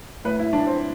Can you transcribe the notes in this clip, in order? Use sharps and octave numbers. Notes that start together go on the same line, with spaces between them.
A2 B4
E4
E3 D4
C4